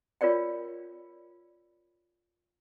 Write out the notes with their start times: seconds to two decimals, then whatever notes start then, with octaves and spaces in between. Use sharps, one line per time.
0.21 F4 A#4 C#5 D5 G5